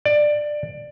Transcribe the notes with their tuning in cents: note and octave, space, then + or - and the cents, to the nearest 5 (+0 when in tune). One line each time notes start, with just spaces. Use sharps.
D5 +15